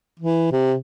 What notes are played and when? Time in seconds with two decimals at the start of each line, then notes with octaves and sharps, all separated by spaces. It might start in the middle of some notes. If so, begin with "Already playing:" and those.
0.19 E3
0.52 C3